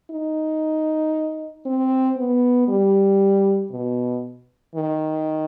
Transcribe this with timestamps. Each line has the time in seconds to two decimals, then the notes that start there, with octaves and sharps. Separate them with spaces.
0.11 D#4
1.65 C4
2.17 B3
2.69 G3
3.71 B2
4.75 D#3